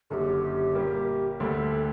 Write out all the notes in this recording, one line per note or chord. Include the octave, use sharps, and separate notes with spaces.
F#1 F#2 D3 G4 A4
A#2 G3 A#3
D2 D3 G3 A4